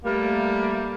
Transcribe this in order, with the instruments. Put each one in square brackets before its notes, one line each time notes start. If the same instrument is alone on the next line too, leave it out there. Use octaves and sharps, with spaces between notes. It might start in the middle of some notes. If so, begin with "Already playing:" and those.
[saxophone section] G3 A3 A#3